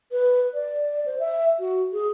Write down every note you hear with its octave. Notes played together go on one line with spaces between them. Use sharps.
B4
D5
C5
E5
F#4
G#4